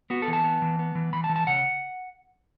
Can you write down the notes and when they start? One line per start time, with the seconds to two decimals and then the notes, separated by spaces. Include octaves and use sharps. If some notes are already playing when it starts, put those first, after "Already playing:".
0.10 B3 F#4
0.22 A4
0.28 E3
0.33 A5
0.44 B3
0.62 E3
0.79 B3
0.95 E3
1.13 E3 B5
1.24 A5
1.29 E3
1.36 A5
1.47 C#3 F#5